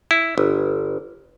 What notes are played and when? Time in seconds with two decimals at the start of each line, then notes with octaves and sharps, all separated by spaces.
0.11 E4
0.38 G1